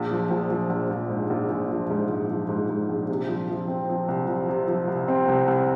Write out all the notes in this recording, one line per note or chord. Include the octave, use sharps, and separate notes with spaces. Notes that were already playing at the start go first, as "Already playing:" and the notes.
Already playing: A#1
F3
A#1
F3
A#1
A#1
G#2
A#1
A#1
F3
G#2
A#1
F3
G#2
G#2
A#1
C3
F3
F3
C4
F3
C2
F3
C3
F3
C2
C4
C2
C2